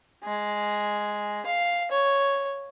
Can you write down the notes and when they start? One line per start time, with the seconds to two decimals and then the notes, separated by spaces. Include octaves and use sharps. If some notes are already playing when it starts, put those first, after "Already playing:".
0.24 G#3
1.46 F5
1.91 C#5